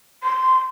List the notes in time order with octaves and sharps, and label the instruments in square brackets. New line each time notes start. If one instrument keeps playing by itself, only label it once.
[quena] C6